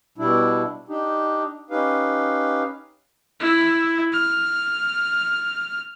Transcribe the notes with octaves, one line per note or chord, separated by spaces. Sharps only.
B2 G3 D4 E4
D4 D#4 G4
C#4 D#4 G4 B4 F5
E4
F6